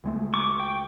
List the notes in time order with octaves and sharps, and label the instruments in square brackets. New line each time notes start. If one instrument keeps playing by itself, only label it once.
[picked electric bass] C#2 G#3 A3
[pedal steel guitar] C#6 D6
G5